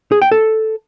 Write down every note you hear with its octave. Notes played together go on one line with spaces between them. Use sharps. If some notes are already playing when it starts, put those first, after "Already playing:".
G#4
G5
A4